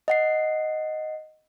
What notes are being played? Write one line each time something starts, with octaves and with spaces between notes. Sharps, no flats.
D#5 F#5 C7